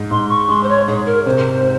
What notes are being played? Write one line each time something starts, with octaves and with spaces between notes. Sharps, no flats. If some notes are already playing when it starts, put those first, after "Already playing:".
Already playing: G#2
G#2 C6
C#6
G#3 C6
C5
C#5
G#2 G#4
A#4
C3 C5